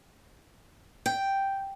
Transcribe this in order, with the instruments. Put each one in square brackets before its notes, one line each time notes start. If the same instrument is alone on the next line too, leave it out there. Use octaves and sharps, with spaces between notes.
[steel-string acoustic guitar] G5